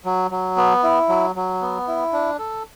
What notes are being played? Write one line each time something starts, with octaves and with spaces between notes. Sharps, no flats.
F#3
F#3
B3
E4
F#3
F#3
B3
E4
D4
A4